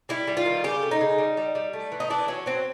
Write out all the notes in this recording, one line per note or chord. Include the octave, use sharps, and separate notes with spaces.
G3 E4
G3
F4
D#3
C#3 G4
A3
D#4
C#3
G3
G3
G3
A3
E3
D#4
E3 D4
F#3 C#4
F#3 C4